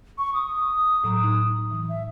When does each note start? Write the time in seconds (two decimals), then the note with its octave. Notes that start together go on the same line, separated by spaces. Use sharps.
0.18 C#6
0.34 D#6
1.04 A2 F#3 A#5
1.24 D#4
1.71 E3
1.89 E5